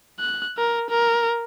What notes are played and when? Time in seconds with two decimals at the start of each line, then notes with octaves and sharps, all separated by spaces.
0.19 F#6
0.57 A#4
0.90 A#4